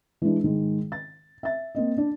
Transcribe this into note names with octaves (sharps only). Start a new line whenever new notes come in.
E3 G#3 D4
G#2 D#3 G#3
A6
E5 A6
A#3 C4 D#5
D4